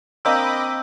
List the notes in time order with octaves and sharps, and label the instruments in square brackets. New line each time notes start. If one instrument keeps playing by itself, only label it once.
[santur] A#3 C4 D4 [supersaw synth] D#5 B5 D6 [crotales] E6 G6